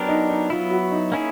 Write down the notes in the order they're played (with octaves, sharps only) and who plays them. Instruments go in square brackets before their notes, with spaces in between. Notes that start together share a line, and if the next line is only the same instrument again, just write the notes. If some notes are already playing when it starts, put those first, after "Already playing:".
Already playing: [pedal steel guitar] F#3 B3 D4 G4 A#4
[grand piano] D#4
D#4
[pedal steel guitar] F#3 B3 E4 [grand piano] F4
[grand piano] F#4
D#4
[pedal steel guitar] A#3 C#4 E4 G#4 [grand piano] D#4